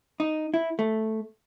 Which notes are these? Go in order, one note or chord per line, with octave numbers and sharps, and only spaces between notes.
D#4
E4
A3